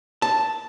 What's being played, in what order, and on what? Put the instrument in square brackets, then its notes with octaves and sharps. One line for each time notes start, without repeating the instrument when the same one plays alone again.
[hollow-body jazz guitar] A5